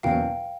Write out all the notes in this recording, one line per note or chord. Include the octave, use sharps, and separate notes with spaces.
E2 B2 F#3 A#3 C#4 F5 G5